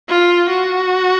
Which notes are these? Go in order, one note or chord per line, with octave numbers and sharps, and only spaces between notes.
F4
F#4